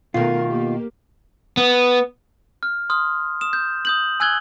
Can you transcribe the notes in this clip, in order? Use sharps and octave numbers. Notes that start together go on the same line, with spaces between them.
B2 D#3 A3 B3 F4 A#4
A#3 G4
B3
F6
C6 D#6 F6
D#6 E7
G6
D#6 G6 F#7
G#5 E6 F#6 G#6 F#7 G7